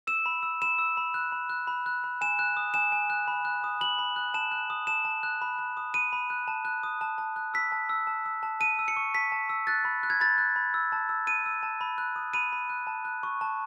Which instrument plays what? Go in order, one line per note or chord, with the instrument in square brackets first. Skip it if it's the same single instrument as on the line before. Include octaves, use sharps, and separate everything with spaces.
[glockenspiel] E6 E7
B5
E6
B5 E7
E6
B5
F#6
B5
F#6
B5
F#6
B5
G#5 E7
F#6
D#6
G#5 E7
G#5
F#6
B5
F#6
D#6
B5 F#7
B5
F#6
A5 E7
F#6
D#6
A5 E7
A5
F#6
B5
F#6
D#6
B5 D#7
B5
F#6
A5
F#6
D#6
A5
A5
F#6
E6 B6
A5
E6
A5
E6
A5
A5 D#7
E6
C#7
C#6
A5 B6
A5
E6
F#6 A6
B5
F#6
G#6
B5 A6
F#6
B5
E6
A5
E6
A5 D#7
E6
A5
B5
F#6
D#6
B5 D#7
B5
F#6
A5
F#6
C#6
A5